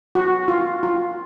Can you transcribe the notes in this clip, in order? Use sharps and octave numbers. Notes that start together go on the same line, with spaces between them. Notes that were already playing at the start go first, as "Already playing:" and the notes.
F#4
F4
F4